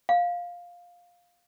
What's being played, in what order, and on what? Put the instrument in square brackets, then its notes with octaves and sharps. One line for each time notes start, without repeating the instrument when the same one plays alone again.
[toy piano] F5